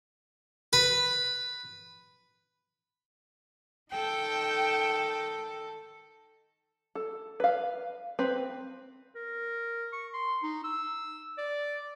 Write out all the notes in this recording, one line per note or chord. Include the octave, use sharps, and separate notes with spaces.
B4
D#3 A4 G5
A4
B4 F5
C4 B4
A#4
C#6
C6
D#4
E6
D5